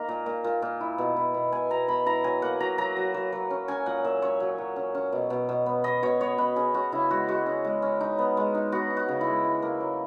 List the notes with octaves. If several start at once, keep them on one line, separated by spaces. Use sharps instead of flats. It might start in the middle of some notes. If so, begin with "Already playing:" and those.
Already playing: A#3 D#4 A#5
A#2
A#2
A#2
A#2
E4
B2
E4
B2
B2 G#5
B2 A#5
B2 B5
E4 A#5
F#3 G#5
A#3 F#5
F#3 A#5
F#3 A#5
F#3
F#3
F#3
C#4
C#4 G#5
A#2 F#5
A#2 E5
C#4 C#5
F#3
F#3
C#4
C#4
B2
B2
B2
B3
B2 D#5
B2 C#5
B3 C#5
B2 B4
C#4 G#4
C#4 F#4
C#3 E4
G#3 F#4
G#3 F#4
C#4
G#3
C#4
D#4
B3
G#3
D#4
B3 F#4
D#4
F#4
C#3
E4
G#3
E4
A#3
F#3